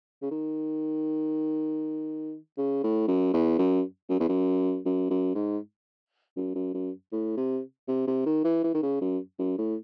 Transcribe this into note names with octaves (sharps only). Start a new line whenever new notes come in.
C#3
D#3
C#3
A2
F#2
E2
F#2
F#2
E2
F#2
F#2
F#2
G#2
F#2
F#2
F#2
A2
C3
C3
C3
D#3
E3
E3
D#3
C#3
F#2
F#2
A2